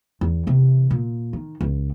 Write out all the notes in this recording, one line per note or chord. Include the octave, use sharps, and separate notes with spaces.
E2
C3 E3
A#2
D#3
C#2